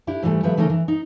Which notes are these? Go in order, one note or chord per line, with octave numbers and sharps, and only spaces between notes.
D4 E4 G4
G#2 E3 F#3 G3 A3
D#3 F3 G3 A3 B4 E5
C#3 E3 A3 D#4 E4 A#4
E3
D#4